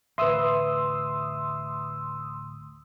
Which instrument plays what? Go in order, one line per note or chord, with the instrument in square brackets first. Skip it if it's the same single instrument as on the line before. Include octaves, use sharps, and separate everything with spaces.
[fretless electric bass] A1 D2 [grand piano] B4 E5 [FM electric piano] C6 D#6 E6